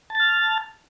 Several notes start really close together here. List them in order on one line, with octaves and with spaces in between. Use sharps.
A5 A6 F6